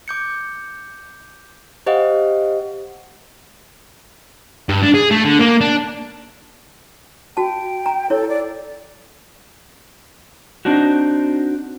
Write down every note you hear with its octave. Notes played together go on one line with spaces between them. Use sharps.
D6 G6 C#7
G4 C5 D#5 F5 F#5
G2
D4
G#4
A3
D3
A#3
D4
F#4 G5 A5
A#5
E4 A4 C#5
D5
C4 D4 D#4 F#4